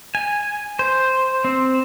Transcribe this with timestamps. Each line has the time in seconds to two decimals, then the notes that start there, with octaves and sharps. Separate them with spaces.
0.15 G#5
0.79 C5
1.45 C4